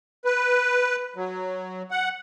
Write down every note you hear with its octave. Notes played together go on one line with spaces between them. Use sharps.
B4
F#3
F#5